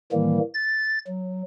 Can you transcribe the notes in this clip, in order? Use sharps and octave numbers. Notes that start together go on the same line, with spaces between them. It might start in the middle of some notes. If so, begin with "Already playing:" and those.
A2 D#3 E3 G3 A#3
A6
F#3